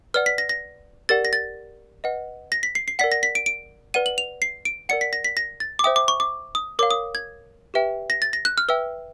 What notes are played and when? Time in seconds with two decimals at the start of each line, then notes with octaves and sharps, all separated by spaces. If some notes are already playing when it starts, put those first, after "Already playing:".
0.14 B4 D5 F#5 F6
0.26 B6
0.38 A#6
0.49 A#6
1.09 G4 A#4 D5 F#5 A6
1.25 A#6
1.33 A6
2.04 B4 D#5 F#5
2.52 A#6
2.63 B6
2.75 C7
2.88 C7
2.99 A#4 D5 F#5 B6
3.12 A#6
3.23 B6
3.35 D7
3.46 D7
3.94 B4 D5 F#5 D#7
4.06 F#7
4.18 F7
4.42 C7
4.65 D7
4.89 A#4 D5 F#5 C#7
5.01 B6
5.13 A#6
5.25 B6
5.37 A#6
5.60 A6
5.79 D6
5.84 C5 E5 G5 D#6
5.96 D6
6.08 C#6
6.20 D6
6.55 D#6
6.79 A#4 C#5 F5 D6
6.91 D#6
7.15 G#6
7.74 G4 B4 E5 G5
8.10 A#6
8.22 A6
8.33 A#6
8.45 F#6
8.58 F6
8.69 B4 E5 G5 E6